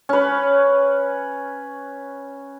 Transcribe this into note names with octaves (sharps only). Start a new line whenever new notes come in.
C#4 B4